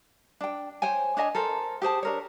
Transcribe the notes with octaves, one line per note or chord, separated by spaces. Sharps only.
D4 G5
C5 C#5 G5 G#5
D4 C#5 D#5 G#5
A4 A#4 C5
G4 G#4 C5 A5
D4 A#4 C#5